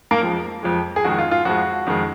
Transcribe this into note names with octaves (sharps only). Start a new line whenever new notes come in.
A#3 A#4
F2 F3 G#3
F2 F3 G#3
G#4
F2 D#3 G#3 F#4
F4
F4
F2 F3 G#3 F#4
F2 D#3 G#3